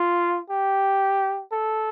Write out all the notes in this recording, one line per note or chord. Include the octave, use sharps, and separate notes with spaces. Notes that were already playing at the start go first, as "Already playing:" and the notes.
Already playing: F4
G4
A4